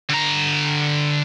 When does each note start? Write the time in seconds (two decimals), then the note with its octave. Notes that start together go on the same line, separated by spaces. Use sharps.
0.09 D3 A#5